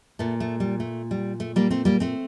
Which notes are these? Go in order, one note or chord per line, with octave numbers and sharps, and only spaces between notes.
A#2 A3
A3
G3
A3
G3
A3
G3 A#3
A3 C4
G3 A#3
A3 C4